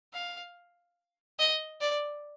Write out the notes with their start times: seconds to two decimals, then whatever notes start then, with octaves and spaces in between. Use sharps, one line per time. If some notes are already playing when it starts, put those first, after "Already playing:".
0.13 F5
1.39 D#5
1.80 D5